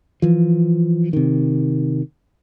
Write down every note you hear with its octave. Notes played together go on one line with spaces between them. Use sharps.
E3 F3
C3 D#3